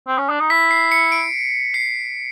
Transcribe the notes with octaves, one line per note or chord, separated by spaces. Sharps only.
C4
C#4
D4
D#4
E4 B6
C7
C#7
D7
C7